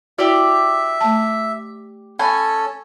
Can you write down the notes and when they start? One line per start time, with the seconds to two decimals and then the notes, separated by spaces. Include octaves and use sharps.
0.18 E4 F#4 G4 D5 E5
1.01 A3 A5
2.19 C#4 A4 G#5 B5